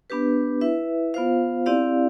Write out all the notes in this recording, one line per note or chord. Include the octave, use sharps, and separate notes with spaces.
B3 D4 G4 B4
E4 B4 E5
B3 F4 C5 F5
C4 E4 G4 D5 F5